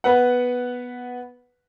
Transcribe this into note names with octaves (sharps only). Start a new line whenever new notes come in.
B3 B4 F#5